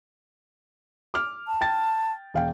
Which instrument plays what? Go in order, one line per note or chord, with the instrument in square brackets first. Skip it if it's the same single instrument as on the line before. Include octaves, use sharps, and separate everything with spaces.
[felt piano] D6 F6
[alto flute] A5
[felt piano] G5 A6
E1 F5 G5